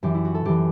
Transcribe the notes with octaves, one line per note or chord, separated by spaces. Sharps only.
F#2 E3 G4
E4
F#4
A4
F#2 E3 G4